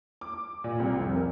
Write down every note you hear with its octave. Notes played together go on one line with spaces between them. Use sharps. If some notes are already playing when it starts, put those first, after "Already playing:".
D6
A#2
C2
F1
A#4